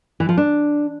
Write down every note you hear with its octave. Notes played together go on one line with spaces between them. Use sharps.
E3
F3
D4